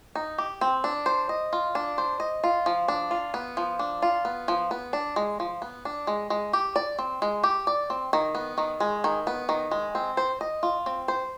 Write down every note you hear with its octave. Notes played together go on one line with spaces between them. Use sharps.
D#4
G4
C4
D4
C5
D#5
F4
D4
C5
D#5
F4
F3
D4
F4
B3
F3
D4
F4
B3
F3
B3
D4
G#3
F3
B3
D4
G#3
G#3
G4
D5
C4
G#3
G4
D5
C4
D#3
B3
D#3
G#3
D#3
B3
D#3
G#3
C4
C5
D#5
F4
C4
C5